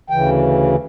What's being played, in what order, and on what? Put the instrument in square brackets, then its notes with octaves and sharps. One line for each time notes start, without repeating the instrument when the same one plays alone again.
[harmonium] D2 C#3 E3 G5